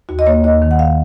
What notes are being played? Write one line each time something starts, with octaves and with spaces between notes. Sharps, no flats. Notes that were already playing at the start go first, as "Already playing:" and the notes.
D#2 F#4
D#5
A#3 C#5
D#2 D#5
D#3
F#5
F5